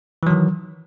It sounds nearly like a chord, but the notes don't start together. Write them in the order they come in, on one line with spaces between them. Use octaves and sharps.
E3 F#3 D#3